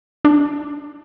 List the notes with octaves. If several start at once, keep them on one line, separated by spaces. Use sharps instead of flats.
D4